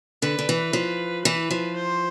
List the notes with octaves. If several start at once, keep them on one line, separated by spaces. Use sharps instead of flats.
D3 B4
D3
E3
F3
E3 B4
F3
C5